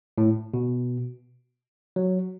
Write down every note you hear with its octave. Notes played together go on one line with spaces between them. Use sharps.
A2
B2
F#3